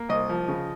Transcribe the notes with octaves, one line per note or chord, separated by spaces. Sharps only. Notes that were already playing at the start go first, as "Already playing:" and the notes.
Already playing: A#3
C2 D#5
F3
C#3